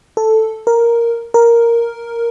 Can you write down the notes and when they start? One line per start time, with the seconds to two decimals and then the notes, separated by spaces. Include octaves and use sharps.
0.17 A4
0.67 A#4
1.34 A#4